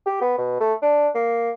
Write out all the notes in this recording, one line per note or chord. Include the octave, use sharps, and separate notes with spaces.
G4
B3
B2
A3
D4
A#3